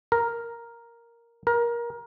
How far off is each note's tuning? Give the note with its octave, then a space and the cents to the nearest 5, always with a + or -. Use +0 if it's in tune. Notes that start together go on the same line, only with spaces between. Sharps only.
A#4 +0
A#4 +20